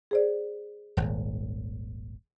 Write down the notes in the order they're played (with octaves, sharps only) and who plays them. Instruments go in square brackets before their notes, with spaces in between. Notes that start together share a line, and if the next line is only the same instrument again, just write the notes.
[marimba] G#4 C5 D5
[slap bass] D#1 G#1